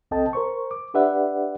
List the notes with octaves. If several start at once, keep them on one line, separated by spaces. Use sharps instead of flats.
C2 C4 A4 D#5 G5 A5
A#4 C5 C#6
D6
D4 G4 B4 D5 E5 F#5